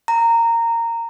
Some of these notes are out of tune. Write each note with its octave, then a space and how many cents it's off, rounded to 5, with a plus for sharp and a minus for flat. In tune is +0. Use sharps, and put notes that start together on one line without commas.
A#5 -15